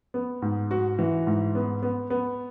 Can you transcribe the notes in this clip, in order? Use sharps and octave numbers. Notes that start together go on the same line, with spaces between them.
B3
G#2
F#4
E3
G#2
B3
B3
B3